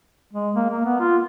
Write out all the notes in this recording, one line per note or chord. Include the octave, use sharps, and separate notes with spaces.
G#3
A#3
A#3
B3
F4